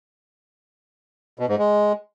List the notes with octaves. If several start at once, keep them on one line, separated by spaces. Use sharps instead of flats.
B2
G#2
G#3